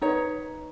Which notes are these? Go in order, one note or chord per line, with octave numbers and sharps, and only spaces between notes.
D#4 B4 C#5